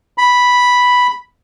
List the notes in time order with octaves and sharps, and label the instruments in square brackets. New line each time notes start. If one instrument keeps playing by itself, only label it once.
[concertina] B5